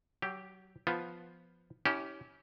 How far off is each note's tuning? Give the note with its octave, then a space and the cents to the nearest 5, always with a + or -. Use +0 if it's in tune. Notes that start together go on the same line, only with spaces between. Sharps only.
F#3 +30 G4 +0
F3 +0 B3 +0 F4 +0
C#4 +15 E4 -35 G4 -15